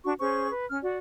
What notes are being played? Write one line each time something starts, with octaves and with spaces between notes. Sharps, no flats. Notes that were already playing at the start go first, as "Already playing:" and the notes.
D4 F#4 C#6
C#4 G#4 C5 C#6
B4
C#4 F6
F#4 D5